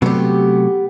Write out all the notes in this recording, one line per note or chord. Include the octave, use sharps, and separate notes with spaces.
C3 F#3 A3 B3 G4